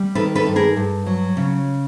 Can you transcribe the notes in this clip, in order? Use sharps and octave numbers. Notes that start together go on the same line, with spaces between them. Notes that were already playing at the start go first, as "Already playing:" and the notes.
Already playing: G3
D#3 A4 B4
A4 B4
G2
G#4 A#4
G2
F#3
C#3